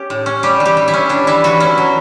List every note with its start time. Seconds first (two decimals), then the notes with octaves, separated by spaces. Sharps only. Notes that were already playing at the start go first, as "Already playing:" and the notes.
Already playing: C#4 G4
0.10 A2
0.26 C#4
0.43 G3 G4
0.60 E3
0.66 G4
0.77 E3
0.88 E4
0.94 C#4
1.09 G3 D4
1.27 E3 E4
1.44 E3 F#4
1.60 C#4 E4
1.78 F#3